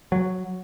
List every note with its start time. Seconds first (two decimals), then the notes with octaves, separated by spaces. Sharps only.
0.12 F#3